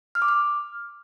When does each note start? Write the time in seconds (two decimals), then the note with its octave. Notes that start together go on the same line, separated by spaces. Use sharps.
0.15 F6
0.22 D6
0.28 F6